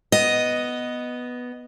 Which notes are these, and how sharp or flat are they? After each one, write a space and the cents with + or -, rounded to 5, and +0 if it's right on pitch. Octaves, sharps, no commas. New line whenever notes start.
B3 +0 D#5 +0